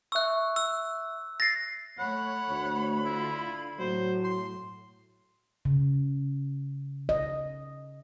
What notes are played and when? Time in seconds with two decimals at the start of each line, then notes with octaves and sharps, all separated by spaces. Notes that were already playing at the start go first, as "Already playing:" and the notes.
0.12 E5 C#6 E6 F#6
0.56 E6
1.40 A6 A#6 C7
1.99 A3 C#5 F#5 B5
2.49 D2
3.05 D3 E4 F4
3.79 A2 F#3 C5
4.24 C6
5.65 C#3
7.09 D#5